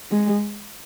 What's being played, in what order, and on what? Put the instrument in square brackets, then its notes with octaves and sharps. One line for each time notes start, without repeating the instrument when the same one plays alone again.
[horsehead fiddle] G#3